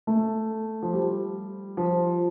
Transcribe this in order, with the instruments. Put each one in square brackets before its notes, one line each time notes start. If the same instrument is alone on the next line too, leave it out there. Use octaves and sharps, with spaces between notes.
[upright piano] A3
F3
G3
F3